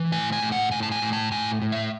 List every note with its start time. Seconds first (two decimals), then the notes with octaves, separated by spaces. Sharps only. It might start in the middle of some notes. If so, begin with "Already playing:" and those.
Already playing: E3
0.12 A2 G#5
0.32 G#5
0.43 A2
0.52 F#5
0.72 A2 G#5
0.83 A5
0.92 G#5
1.02 A2
1.13 A5
1.32 A2 G#5
1.62 A2
1.72 E5